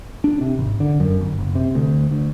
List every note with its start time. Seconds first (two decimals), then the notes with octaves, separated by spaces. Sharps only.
0.24 D4
0.41 C3
0.59 G#1
0.80 D3
1.00 F#2
1.21 G1
1.39 F#1
1.55 C3
1.75 D2
2.11 D2